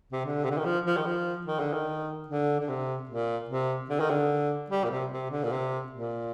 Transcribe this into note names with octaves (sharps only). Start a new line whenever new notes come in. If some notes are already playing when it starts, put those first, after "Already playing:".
C3
D3
C3
D3
D#3
F3
F3
D#3
F3
D#3
D3
D#3
D3
D3
C3
A#2
C3
D3
D#3
D3
G3
A#2
C3
C3
D3
A#2
C3
A#2